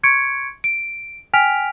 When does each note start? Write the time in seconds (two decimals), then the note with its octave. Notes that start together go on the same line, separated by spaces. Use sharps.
0.03 C6 C#6 G#6 C#7 D7
0.64 D7
1.33 G5 G#5 F6 B6 D7 F7